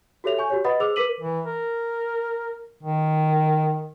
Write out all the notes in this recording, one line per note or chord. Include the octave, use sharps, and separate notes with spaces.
F#4 G4 A4 C#5 E5 F7
G#5 C#6 G6
F#4 G4 C#5
B4 D#5 F#5 B5 D#6 A6
G#4 C5 D6 E6 F7
A#4 B4 D6 B6 D#7 F#7
E3
A#4
D#3